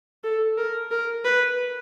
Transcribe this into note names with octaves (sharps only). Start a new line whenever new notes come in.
A4
A#4
A#4
B4